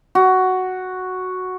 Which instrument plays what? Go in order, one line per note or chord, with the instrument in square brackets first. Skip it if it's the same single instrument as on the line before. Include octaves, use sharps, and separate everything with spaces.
[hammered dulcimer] F#4